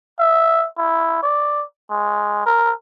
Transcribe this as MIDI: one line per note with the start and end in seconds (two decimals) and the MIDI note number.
0.20 0.67 76
0.77 1.22 64
1.23 1.64 74
1.91 2.44 56
2.46 2.73 70